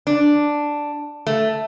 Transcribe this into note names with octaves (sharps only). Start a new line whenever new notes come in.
D4
A3